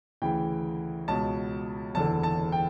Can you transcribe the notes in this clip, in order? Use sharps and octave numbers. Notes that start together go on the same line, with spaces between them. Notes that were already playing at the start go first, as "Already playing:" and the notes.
D2 C#3 E3 G5
C#2 B2 A5
F#1 E2 D3 A5
A5
G5